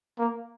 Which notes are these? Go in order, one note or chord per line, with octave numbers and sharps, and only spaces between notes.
A#3